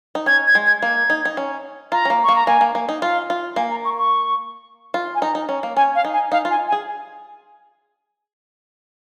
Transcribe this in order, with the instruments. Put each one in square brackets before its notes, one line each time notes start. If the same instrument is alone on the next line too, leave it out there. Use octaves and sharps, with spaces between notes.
[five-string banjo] D#4
[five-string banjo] C#4 [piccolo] G#6
[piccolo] G#6
[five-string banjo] G#3
[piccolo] G#6
[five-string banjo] A#3 [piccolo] G#6
[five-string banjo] D#4
D#4
C#4
[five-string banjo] F4 [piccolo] A#5
[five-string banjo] C#4
A#3
[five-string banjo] A#3 [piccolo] C#6
[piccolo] A#5
[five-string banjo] A#3 [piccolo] G#5
[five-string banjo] A#3
A#3
D#4
[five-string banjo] F4 [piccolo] F5
[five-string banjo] F4
[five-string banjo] A#3 [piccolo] G#5
[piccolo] A#5
C#6
C#6
[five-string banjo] F4
[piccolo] G#5
[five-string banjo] D#4 [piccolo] A#5
[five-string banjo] D#4
C#4
A#3
[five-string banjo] C#4 [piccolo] G#5
[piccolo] F5
[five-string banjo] D#4
[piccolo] G#5
[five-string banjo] D#4 [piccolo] F5
[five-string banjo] F4
[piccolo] G#5
G#5
[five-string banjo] G#4